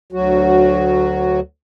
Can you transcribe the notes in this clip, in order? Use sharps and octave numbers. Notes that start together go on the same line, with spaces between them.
D2 F#3 F#4